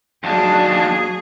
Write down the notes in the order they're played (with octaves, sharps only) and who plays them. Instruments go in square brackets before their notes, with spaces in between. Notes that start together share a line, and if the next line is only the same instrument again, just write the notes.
[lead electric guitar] D#2 D4 [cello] F#3 G#4